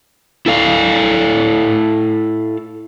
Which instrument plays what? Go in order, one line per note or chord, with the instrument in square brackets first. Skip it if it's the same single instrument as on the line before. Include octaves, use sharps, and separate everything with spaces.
[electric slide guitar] E4 A4 F5